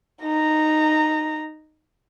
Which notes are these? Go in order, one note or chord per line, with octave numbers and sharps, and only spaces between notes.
D#4 A#5